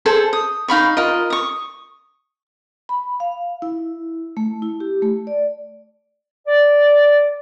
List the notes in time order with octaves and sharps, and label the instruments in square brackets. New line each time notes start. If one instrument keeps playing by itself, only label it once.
[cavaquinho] G#4 A4 C5
D#6
D#4 F5 B5 C#6
F4 A#4 D#5
C#6 D#6
[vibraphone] B5
F5
E4
A3
E4
G4
A3
D5
[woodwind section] D5